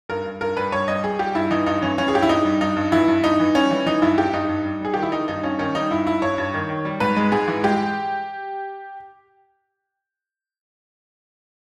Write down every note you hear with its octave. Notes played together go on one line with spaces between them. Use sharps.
G2 A#4
G2
G2 A#4
G3 B4
G2 C#5
G3 D#5
G3 G#4
G3 G4
G2 E4
E3 D#4
G2 D#4
E3 C#4
E3 C#4
G#4
G2 G4
E4
G2 D#4
G3
G2 D#4
G2
E3 E4
G2
G2 D#4
E3
G3 C#4
E3
E3 D#4
G2 E4
G2 G4
G2 D#4
G2
G3
G3 G#4
D#3 G4
E4
D#3 D#4
G2 D#4
G2 C#4
D#3 C#4
G3 D#4
G2 E4
G2 E4
G2 C#5
G2
D#3
D#3
G3
G#2 B4
G#3
G#2 G#4
E3
G#3 G4